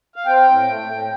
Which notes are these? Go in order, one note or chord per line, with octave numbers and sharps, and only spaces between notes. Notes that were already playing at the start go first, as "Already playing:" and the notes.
F5
C4 G5
A2
A3
A2